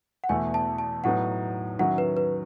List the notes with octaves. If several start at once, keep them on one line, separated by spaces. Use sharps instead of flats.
F#5
E2 B2 A3 E4 G#5
A5
A5
A2 F#3 B3 D#4 F#5
D#3 F#3 C#4 E4 F#5
B4
B4